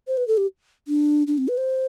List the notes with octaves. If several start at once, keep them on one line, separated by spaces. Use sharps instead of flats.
C5
B4
A4
G4
D4
D4
C4
B4
C5